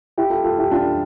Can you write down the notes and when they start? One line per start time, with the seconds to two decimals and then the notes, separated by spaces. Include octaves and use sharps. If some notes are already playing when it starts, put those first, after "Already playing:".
0.18 E4 G4
0.30 F4 A4
0.44 F4 A4
0.59 E4 G4
0.71 D4 F4